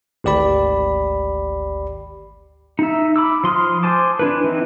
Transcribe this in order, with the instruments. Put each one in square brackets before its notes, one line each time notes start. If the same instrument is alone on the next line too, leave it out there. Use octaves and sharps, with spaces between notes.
[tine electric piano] G#1 D2 G4 D5 B5
[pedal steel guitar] D#4 E5
B5 D6 E6
F3 C6 D#6 F6
C5 G#5 A5 D6
D4 E4 B4
E3 C4 D#4 E4